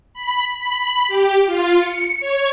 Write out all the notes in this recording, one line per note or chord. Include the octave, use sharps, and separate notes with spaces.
B5
B5
G4
F4
C#7
C#5